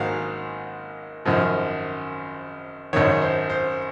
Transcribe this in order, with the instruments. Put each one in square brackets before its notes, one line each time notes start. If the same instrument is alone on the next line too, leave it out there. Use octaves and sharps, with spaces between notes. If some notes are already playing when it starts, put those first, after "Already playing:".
Already playing: [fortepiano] G#1 G#2 D#3 F#3 A#3 F5 F#5
G#1 F#2 F3
G#1 F#2 D#3 C#5
C5
C5